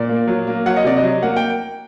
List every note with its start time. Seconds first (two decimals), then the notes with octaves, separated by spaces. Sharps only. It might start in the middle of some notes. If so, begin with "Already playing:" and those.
Already playing: A#2 D5
0.09 A#3
0.27 F#3
0.47 A#3
0.66 F#3 F#5
0.76 D#5
0.84 C3 D5
0.96 D#5
1.03 F#3
1.22 A#3 F#5
1.36 G5